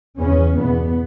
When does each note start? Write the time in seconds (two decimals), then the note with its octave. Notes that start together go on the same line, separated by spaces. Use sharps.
0.20 E2 C#3 C#4
0.57 E2 B2 B3